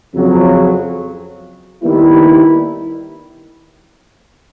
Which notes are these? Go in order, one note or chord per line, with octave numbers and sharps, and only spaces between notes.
F2 C#3 F#3
D#2 D#3 G3 B3 E4